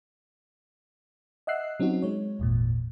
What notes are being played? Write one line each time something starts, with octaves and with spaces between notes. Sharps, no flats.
D#5 E5 F#5 E6 F#6 C7
F#3 C4 C#4 D#4 F#4
G#3 C#5
G#1 E2 A#2